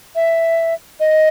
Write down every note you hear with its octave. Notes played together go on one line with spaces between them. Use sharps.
E5
D#5